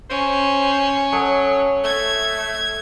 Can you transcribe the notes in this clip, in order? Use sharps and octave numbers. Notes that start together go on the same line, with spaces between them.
C#4 C5
F#3 A4 C#5 D#5
A3 G#6